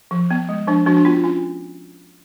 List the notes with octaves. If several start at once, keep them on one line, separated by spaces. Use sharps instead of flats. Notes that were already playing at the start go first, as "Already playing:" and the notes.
F3
B3
G#3
F3 D4
F3 D4 F#4
D4
B3 F4
C#4 F4